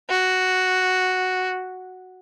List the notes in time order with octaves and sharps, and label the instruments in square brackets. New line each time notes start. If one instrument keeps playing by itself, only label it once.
[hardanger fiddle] F#4